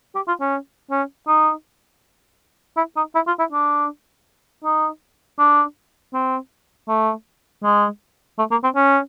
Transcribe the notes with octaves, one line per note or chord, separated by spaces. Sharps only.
G4
F4
C#4
C#4
D#4
E4
D#4
E4
F4
E4
D4
D#4
D4
C4
A3
G#3
A3
A#3
C4
C#4